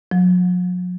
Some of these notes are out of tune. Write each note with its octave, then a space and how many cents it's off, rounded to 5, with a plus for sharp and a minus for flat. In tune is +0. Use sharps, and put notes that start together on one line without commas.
F#3 -45